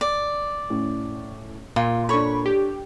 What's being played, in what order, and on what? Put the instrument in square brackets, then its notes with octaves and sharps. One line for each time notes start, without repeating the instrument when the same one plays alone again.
[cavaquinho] D5
[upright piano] A2 C#4
[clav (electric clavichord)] A#2 [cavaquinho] F4
[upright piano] D4 A4 [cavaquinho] C#5 [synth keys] B5 C#6
[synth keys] G4